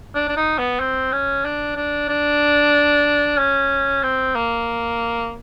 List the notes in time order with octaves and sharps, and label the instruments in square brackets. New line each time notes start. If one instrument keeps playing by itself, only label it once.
[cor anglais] D4
D4
D#4
B3
C4
C#4
D4
D4
D4
C#4
C4
A#3